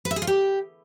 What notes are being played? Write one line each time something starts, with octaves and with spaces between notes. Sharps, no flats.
B4
E5
G#4
F4
G4